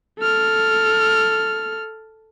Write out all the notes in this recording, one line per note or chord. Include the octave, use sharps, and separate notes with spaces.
A4 F6